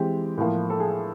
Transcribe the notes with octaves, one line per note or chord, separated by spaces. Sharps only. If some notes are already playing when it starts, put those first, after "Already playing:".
Already playing: E3 G#3 C4 G4
A2 F3 A#3
A4
G#4